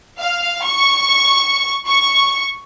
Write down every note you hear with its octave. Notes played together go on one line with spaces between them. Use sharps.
F5
C#6
C#6